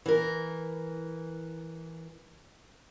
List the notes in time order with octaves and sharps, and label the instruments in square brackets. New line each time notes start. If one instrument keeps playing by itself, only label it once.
[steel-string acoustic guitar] E3 A#4